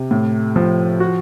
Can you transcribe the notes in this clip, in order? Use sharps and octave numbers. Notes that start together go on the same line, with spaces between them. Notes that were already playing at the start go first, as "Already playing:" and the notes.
Already playing: C3
A2
F3
F#4